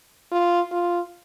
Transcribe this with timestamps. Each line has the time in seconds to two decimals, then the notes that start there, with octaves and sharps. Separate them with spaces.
0.32 F4
0.71 F4